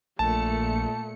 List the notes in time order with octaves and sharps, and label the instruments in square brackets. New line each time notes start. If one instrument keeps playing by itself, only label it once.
[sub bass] A#1 [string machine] A#2 C#7 [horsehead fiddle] A3 [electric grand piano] A5